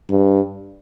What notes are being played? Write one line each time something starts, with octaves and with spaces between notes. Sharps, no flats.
G2